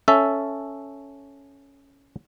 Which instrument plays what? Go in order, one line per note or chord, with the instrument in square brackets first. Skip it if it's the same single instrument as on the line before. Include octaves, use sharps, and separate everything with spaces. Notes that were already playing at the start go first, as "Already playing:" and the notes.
[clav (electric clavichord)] C#4 A4 E5